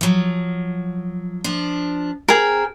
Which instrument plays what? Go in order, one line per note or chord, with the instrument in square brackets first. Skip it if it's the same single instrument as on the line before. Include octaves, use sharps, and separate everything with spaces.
[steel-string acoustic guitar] F3 F#3
F3 D4
[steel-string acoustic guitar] C4 [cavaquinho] G#4 A#4